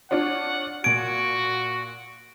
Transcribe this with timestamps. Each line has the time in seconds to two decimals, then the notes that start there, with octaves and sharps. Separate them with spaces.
0.11 D4 F4 C#5 F#5
0.84 A#2 F#4 G#6 D7